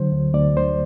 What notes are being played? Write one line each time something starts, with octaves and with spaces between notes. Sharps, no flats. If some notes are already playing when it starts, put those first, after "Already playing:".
Already playing: D3 F#3 C5
D2
D2 D5
D2 C5